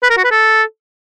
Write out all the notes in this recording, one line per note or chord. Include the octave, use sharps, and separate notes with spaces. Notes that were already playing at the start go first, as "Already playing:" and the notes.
B4
A#4
F#4
B4
A4